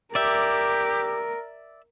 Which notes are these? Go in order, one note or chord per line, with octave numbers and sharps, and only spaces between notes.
G4 A#4 D5 E5